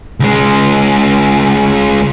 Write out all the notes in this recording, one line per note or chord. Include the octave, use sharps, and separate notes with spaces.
C#2 G#3